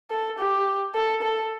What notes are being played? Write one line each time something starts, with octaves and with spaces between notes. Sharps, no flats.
A4
G4
A4
A4